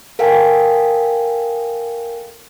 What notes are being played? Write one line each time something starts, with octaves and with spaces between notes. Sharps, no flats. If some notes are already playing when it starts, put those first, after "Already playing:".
A4 A#4 F5 G5 G#5